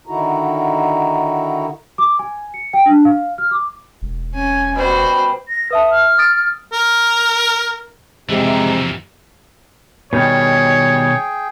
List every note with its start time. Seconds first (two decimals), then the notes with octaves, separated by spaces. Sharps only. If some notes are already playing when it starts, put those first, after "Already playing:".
0.07 D3 D#3 D#4 E4 F#4 A#5
1.98 D6
2.19 G#5
2.54 C#7
2.73 G5
2.86 D4
3.05 F5
3.38 F6
3.51 D6
4.02 E1
4.34 C#4 G#5
4.75 B2 G3 F#4 C5
5.48 A#6
5.71 B4 E5 A5 D#6
5.91 F6
6.18 D#6 A6 D7
6.73 A#4
8.29 F2 C3 E3 G#3 G4 E5 A#5
10.13 B2 D#3 G3 G#4 C#5 G5